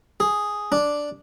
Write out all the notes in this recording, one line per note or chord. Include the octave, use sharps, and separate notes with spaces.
G#4
D4